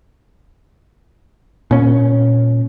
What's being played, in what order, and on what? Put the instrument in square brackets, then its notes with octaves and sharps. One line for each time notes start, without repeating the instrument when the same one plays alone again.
[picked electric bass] A#2 C#4